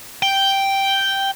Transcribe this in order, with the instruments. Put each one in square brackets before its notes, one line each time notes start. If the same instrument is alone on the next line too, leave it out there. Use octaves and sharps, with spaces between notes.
[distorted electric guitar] G5